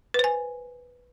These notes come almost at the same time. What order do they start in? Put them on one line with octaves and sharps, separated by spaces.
B4 C5 G#5